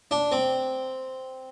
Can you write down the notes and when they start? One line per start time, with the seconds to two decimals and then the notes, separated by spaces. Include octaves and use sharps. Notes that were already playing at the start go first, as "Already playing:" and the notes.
0.11 D4
0.32 C4